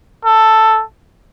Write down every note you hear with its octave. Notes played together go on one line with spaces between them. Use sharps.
A4